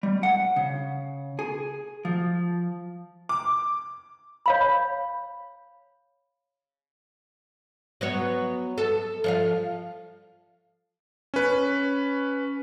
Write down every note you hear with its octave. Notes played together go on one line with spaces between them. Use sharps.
G3
F#5
C#3
G#4
F3
D6
C#5 F5 B5
F#3 B3 C#5
A4
F3 C#5 F5
C#4 B4